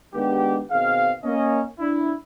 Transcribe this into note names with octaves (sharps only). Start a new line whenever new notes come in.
D#3 G#3 B3 D4 G4
B2 D#3 C4 G#4 F5
A#3 C#4 D#5
D4 E4